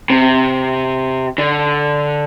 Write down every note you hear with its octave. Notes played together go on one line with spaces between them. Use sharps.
C3
D3